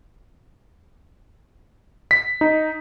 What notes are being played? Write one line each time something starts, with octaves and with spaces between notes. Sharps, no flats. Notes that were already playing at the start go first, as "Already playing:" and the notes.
B6
D#4